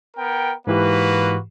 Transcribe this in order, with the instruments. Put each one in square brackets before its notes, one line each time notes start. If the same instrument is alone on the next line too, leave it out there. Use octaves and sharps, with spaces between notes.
[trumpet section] B3 A#4 G5
[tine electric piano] G#2 E3 G4 [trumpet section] A#3 F#4 B4